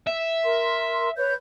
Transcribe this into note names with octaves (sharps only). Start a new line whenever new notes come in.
E5
A#4 C6
B4 C#5 G6